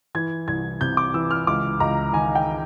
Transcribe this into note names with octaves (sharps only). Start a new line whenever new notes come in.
E3 G#6
C2 G#6
C3 G6
D6
E3 E6
F6
C#2 D6
C#2 A#5
D#3 G#5
G5